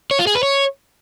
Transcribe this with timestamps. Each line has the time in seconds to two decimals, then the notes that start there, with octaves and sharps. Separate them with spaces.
0.11 C#5
0.19 F4
0.27 G#4
0.35 B4
0.43 C#5